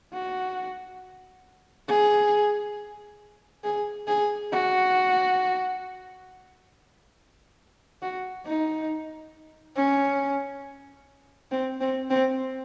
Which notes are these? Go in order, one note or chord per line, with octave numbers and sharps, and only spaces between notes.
F#4
G#4
G#4
G#4
F#4
F#4
D#4
C#4
C4
C4
C4